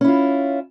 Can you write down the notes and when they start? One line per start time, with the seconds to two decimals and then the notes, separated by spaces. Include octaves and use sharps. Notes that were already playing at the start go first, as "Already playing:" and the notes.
0.01 C#4
0.04 E4
0.08 F4